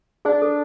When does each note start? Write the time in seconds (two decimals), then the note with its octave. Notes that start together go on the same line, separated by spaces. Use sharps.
0.25 D4 G#4
0.42 A4